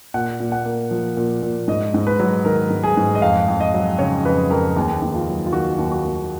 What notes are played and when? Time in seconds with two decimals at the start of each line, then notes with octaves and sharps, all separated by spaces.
0.14 A#2 F#5
0.40 A#2
0.52 F#5
0.65 A#3
0.91 F3
1.17 A#2
1.42 A#2
1.68 G#2 D#5
1.94 G#2
2.07 B4
2.20 F#3
2.45 D#3 A#4
2.70 G#2
2.83 G#4
2.97 G#2
3.15 D#5
3.22 F2 F5
3.48 F2
3.60 D#5
3.74 F#3
3.99 C#3 C#5
4.25 F2 B4
4.50 F2 A#4
4.76 D#2 G#4
5.02 D#2
5.14 F4
5.28 F#3
5.46 F4
5.53 D#3 F#4
5.79 D#2
5.92 F#4
6.04 D#2